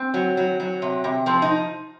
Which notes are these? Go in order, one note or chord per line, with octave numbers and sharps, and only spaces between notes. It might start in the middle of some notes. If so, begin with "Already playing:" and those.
Already playing: C4
F#3
F#3
F#3
C3
C3
F3 C4
D#4